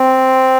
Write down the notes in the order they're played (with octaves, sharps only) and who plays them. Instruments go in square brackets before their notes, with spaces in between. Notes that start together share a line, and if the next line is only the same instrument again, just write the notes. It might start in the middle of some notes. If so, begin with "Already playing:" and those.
Already playing: [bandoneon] C4